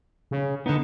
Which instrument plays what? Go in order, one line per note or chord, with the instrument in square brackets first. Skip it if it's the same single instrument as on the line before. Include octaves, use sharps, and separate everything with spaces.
[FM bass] C#3
[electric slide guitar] D3 B3 [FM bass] D#4